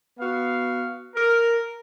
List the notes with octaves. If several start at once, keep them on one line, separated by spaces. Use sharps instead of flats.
B3 F#4 F5
A#4